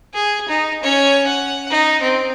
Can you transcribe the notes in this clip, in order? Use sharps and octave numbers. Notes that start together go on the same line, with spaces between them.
G#4
D#4
C#4 C#5
F#5
D#4
C4